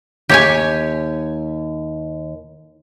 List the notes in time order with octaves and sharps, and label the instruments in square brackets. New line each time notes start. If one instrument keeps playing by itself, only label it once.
[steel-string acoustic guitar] D#2 [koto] G4 C#5 G#5